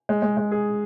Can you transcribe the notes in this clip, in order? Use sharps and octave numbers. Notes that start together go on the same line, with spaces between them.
G#3
G#3
G#3
G#4